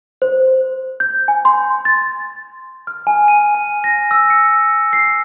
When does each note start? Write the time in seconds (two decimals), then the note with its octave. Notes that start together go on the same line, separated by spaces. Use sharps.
0.22 C5
1.00 G6
1.28 G#5
1.45 C6
1.85 A6
2.87 F6
3.07 G#5
3.28 D#7
3.55 G#5
3.84 A#6
4.11 E6
4.30 C#7
4.93 C7